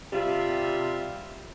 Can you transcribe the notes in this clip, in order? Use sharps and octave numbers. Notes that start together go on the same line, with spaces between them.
C3 G3 F4 E5